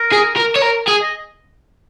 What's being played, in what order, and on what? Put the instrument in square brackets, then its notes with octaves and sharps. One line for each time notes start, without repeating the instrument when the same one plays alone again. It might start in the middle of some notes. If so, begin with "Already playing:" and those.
Already playing: [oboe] A#4
[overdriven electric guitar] G#4
A#4
C#5
A#4
G#4
[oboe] D#5